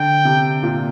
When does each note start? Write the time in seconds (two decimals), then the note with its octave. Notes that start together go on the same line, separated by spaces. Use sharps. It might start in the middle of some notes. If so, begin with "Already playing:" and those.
Already playing: D3 G5
0.25 C3
0.63 A#2